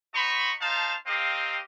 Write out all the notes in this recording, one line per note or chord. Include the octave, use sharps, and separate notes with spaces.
F#4 C5 D#5 A#5 B5 C#6
D#4 C5 F5 A5
C4 G4 A#4 D#5 F5